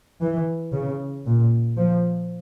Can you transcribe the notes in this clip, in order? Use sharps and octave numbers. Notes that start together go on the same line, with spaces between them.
E3
C#3
A#2
F3